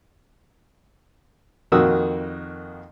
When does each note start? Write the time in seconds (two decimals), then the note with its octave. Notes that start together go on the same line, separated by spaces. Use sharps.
1.72 F2 D#3 A#3 F#4 D#6 E6